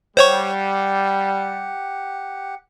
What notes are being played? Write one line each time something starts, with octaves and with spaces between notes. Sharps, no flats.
G3 G4 C5 C#5 F#5 C#6